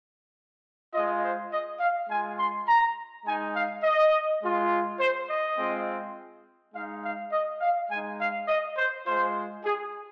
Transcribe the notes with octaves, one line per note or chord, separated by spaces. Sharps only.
G#3 F4 D#5
C5
D#5
F5
G#3 F4 G#5
C6
A#5
G#3 D#4 G#5
F5
D#5
G#3 F4
C5
D#5
G#3 C4 F4
G#3 D#4 F5
F5
D#5
F5
G#3 D#4 G#5
F5
D#5
C5
G#3 F4 C5
G#4